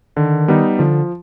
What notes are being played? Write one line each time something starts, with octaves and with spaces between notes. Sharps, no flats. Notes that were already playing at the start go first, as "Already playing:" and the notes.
D3 D#3
G3 B3 D#4
D3 F3